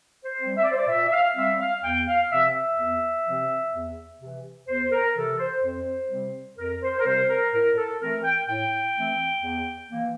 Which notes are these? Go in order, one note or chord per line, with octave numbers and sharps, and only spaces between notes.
C5
G3 C4
E5
D5
C5
D5
A#2 E5
E5
F5
G3 C4 E5
F5
E2 G5
F5
C3 F3 C4 E5
E5
E2
C3 F3 C4
E2
C3 E3
E2 C5
A#4
C3 E3 A4
C5
F2 C5
C3 G3 C4
F2 A#4
C5
A#4
C3 G3 C4 C5
A#4
A2 A#4
A4
E3 A3 C4 A#4
G5
A2 G5
E3 A3 C4
E2
E3 A#3